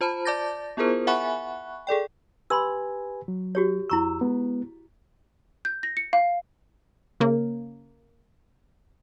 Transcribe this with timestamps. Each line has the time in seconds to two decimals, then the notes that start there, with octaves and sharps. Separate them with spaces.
0.01 F4 C5 A5 B5
0.25 D5 A5 D6 G6 A6 A#6
0.77 B3 E4 F4 G#4 A#4 C5
1.07 E5 F#5 G#5 B5 C#6 F#6
1.87 G#4 A4 D5 G5
2.50 G4 B4 G#5 B5 C6 E6
3.28 F#3
3.55 F#4 G4 C#5
3.90 F2 E4 A#5 C#6 E6
4.21 G#3 B3
5.65 G6
5.83 A#6
5.97 C#7
6.13 F5
7.20 C#3 A#3